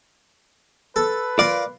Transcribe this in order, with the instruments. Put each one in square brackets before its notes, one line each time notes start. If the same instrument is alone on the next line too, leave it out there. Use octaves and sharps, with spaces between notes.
[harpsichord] A4 [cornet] B4
[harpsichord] F4 A#4 C6 [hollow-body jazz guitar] D5